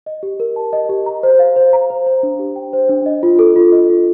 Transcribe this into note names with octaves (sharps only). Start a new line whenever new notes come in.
D#5
G4
A#4
A5
D#5
G4
A#5
C5
F5
C5
A#5
C5
C5
D4
G4
G5
C5
D4
D#5
F4
A4
F4
D#5
F4